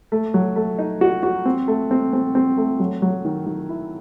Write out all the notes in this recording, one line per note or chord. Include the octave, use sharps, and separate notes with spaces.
A3
F#3
A3
D#4
F#4
F#4
C4
A3
C4
C4
C4
A3
F#3
F#3
D#3
D#3
E4